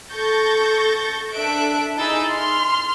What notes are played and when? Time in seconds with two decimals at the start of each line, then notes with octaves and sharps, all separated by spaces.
0.13 A4 C#6 G6 A6 A#6
1.33 D4 A4 E5 F#6 D7
1.97 D#4 E4 G#4 E6 G6 A6
2.31 C6 F6